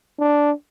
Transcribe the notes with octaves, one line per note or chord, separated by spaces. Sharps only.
D4